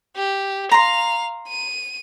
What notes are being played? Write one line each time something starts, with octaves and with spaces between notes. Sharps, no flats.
G4
F5 A#5 C6 F7
D#7